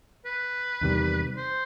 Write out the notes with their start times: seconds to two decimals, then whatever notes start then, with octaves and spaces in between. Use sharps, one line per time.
0.25 B4
0.81 E2 C3 D#3 G3
1.37 C5